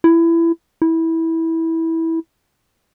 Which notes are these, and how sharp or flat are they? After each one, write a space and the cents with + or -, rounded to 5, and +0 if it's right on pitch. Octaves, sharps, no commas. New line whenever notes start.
E4 +20
E4 -15